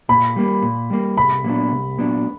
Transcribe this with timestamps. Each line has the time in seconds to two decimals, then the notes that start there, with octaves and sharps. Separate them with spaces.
0.09 A#2 B5
0.36 G3 A#3
0.62 A#2
0.90 G3 A#3
1.17 C2 B5
1.44 A#2 F#3 B3 D4
1.72 C2
1.98 A#2 F#3 B3 D4